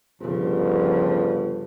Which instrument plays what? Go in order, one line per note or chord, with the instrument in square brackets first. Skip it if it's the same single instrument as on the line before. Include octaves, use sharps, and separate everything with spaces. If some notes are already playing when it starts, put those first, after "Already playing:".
[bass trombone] G1 [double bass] C#3 F3